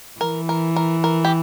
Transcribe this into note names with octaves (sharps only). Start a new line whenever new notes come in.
E3 A#4
A#4
A#4
A#4
G4